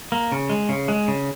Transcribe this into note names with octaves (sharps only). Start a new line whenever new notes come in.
A#3
C#3
G#3
C#3
G#3
C#3